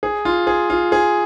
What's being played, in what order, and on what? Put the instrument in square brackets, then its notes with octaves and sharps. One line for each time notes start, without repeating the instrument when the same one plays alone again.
[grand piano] G#4
F4
G#4
F4
G#4